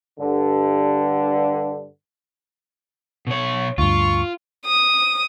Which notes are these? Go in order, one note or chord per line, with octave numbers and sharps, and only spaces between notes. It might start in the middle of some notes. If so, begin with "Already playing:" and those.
G2 D3
B2 C#5
D2 G2 F4 C#6
D#6